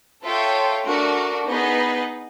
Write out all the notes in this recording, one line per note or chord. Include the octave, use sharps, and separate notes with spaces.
F4 A4 C#5 E5 G5
A3 D4 F#4 A#4
B3 D#4 G#4 B4 D#5